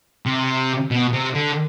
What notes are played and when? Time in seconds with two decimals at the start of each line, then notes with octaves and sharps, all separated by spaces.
0.26 C3
0.91 B2
1.13 C3
1.35 D3